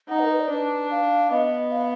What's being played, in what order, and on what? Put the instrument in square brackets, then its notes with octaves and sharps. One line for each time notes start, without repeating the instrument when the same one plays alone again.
[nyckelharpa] D#4 [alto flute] F#5
[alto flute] B4
A#4
B4
D5
[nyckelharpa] D4 [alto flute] B4
[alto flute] F5
[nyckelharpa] B3 [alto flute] D#5
[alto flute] F5